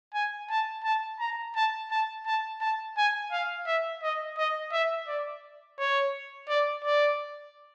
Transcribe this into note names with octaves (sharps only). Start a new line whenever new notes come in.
G#5
A5
A5
A#5
A5
A5
A5
A5
G#5
F5
E5
D#5
D#5
E5
D5
C#5
D5
D5